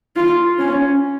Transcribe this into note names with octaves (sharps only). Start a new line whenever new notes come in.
F4
C#4